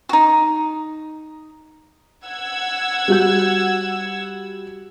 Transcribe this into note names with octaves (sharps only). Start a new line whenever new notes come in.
D#4 F#4
F#5 E6 G#6
G3 F#4 G6